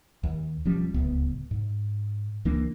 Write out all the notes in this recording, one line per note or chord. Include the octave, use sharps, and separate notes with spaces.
D#2
E1 F3 G3 C#4
D1 C#2 B3
G#2
C#2 E3 A#3 D4